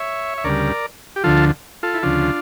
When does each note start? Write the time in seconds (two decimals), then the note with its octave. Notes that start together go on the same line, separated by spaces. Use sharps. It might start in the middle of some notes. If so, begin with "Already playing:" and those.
Already playing: C#5 E5
0.38 E5
0.44 D2 C#3 G3 A#4 D5
1.16 G4
1.24 D2 D3 F3 F4 A4
1.83 F4 A4
1.94 E4
2.02 D2 C#3 F3 D4 F4